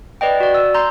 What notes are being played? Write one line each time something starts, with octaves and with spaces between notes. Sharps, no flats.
B4 D5 D#5 G5
F#4 D5
E6
A#5 C6 G6